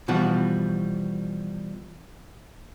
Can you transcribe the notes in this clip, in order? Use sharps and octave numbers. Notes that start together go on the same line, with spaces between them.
B2 E3 F3 G3 F#4